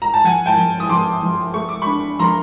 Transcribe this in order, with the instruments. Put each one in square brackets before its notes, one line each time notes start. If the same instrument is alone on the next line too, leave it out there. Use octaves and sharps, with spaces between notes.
[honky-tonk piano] A#5
A5
[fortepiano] F3 [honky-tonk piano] F#5 G#5
[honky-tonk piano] G5 A5
[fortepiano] F3
[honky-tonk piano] D#6
[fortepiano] F3 [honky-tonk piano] C6 D6
[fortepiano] F3
[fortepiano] A3 [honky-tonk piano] C#6
[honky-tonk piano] D6
[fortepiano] D4 [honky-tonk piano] B5 C#6
[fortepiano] F3 [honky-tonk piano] A#5 C6